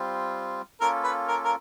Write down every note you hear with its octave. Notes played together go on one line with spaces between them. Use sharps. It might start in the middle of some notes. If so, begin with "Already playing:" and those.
Already playing: G3 C4 F4
A#3 C#4 F4 A4 A#4
B4
A#4
A#4